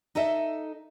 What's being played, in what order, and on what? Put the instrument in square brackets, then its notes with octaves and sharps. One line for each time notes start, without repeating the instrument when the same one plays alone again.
[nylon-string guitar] D#4 A4 D#5 E5